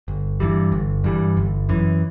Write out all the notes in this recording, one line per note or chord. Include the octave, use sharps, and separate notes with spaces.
G1
G2 E3 G3
G1
G2 E3 G3
G1
F#2 E3